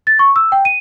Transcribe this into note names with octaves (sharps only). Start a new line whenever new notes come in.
A6
C#6
E6
G5
D#7